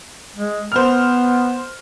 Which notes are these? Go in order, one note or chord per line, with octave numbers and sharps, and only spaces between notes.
G#3
B3 C5 F6